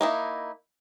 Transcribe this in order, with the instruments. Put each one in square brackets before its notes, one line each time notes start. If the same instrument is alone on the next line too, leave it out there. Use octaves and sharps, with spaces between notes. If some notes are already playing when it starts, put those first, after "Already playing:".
[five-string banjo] A#3 D#4 E4